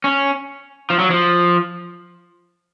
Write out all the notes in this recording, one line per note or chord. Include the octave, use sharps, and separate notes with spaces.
C#4
F3
F#3
F3